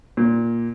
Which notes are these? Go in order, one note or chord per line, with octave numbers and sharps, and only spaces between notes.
A#2